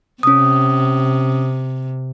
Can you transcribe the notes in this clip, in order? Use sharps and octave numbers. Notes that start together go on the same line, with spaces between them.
C3 C#4 D#6